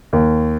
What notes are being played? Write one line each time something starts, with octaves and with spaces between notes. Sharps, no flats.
D#2